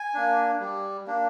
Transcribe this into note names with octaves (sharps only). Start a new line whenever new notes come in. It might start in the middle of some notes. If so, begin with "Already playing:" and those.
Already playing: G#5
A#3 D4
G3
A#3 D4